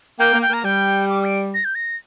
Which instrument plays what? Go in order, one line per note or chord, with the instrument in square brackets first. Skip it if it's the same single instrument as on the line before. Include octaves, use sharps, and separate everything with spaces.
[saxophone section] A#3 [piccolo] G5
[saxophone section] A#3
[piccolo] G5
[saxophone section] A#3 [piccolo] A#5
[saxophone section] G3 [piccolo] G5
[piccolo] D6
D7
A#6
G6
A#6